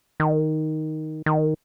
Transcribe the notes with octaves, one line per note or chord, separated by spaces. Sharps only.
D#3
D#3